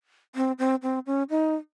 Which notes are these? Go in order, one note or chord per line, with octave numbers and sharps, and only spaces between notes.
C4
C4
C4
C#4
D#4